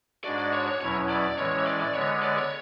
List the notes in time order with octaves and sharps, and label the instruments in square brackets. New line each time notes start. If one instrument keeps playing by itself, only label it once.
[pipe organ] G#2 G#3 D4 F#4 [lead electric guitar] D5
[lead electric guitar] D5
C#5
C#5
[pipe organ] E2 B2 F#3 C#4 E4 [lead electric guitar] C#5
[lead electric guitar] D5
[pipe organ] A2 E3 G#3 C#4 [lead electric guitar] C#5
[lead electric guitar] C#5
D5
D5
[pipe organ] D3 G#3 B3 [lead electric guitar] C#5
[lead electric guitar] D5
C#5